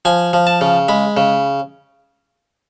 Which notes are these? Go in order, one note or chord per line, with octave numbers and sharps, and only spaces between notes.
F3 G#5
F3
A5
C#3
G#3 B5
C#3